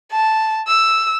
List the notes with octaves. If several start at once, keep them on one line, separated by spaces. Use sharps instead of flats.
A5
E6